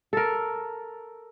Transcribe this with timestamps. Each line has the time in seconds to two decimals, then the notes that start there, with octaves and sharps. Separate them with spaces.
0.13 A4 A#4